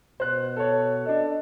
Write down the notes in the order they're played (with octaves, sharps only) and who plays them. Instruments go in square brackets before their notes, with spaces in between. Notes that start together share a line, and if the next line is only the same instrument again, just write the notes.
[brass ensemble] B2 [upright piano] C5 F#6
[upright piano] A4 C#5
[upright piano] D4 A4 [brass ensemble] D#5